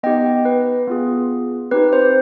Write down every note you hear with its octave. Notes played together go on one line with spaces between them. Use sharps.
B3 D#4 G4 D#5 G5
B4
B3 F4 G#4
C4 D#4 G4 B4
C5